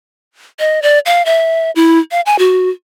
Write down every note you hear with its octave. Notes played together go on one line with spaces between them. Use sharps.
D#5
D5
F5
E5
E4
F5
G#5
F#4